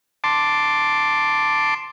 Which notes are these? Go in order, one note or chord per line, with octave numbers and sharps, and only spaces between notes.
A5 C6 D6